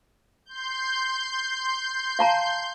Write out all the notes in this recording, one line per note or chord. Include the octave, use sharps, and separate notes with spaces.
C6 G6
F5 A5 A#5